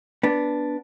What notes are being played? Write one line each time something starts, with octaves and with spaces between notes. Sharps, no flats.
B3 D4